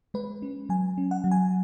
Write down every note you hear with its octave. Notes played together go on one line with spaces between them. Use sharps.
G#3 B4
C#4
F#3 G#5
C#4
F#5
F#3
G#5